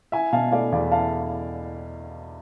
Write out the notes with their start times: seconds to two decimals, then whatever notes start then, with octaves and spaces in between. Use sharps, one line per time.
0.12 E4 E5 G#5
0.33 B2 F5 A5
0.52 A3 D5 F5
0.72 E2 D5 F5
0.92 E4 F5 A5